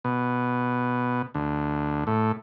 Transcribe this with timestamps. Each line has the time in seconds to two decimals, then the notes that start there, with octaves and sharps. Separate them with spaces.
0.05 B2
1.34 D2
2.07 A2